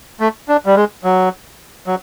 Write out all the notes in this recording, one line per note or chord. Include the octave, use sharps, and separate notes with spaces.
A3
D4
G3
G#3
F#3
F#3